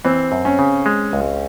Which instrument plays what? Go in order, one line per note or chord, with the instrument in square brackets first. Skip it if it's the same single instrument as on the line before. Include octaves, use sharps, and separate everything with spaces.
[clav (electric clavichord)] E3 [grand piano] C4
[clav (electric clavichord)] F#2
[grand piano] C#4
[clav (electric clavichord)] C#3
G#3
C#2